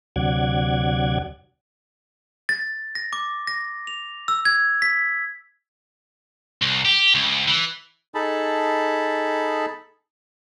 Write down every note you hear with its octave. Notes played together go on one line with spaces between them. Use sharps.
D2 C3 F#3 D5 F#5 G#6
A6
A#6
D6
A#6
F7
E6
G#6
B6
C2
G4
C#2
E3
D#4 G#4 A4 A5 B5